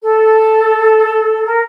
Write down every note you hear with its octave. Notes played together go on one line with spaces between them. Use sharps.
A4
A#4